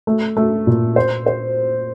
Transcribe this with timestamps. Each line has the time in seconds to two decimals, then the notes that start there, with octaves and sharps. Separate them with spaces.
0.07 A3
0.37 A3
0.67 A#2
0.96 C5
1.26 C5